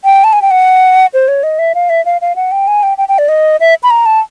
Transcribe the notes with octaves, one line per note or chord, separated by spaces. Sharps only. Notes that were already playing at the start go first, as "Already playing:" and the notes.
G5
A5
G#5
G5
F#5
C5
C#5
D#5
E5
F5
E5
F5
F5
F#5
G5
G#5
G5
G5
G5
D5
D#5
E5
B5
A#5
A5